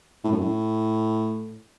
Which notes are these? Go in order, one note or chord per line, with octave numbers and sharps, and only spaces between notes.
A2
F#2
A2